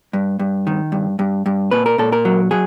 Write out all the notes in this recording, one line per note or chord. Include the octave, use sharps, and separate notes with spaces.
G2
G2
D#3
G2
G2
G2
A#2 B4
A#4
A#2 A4
A#4
F#3
F#3 G#4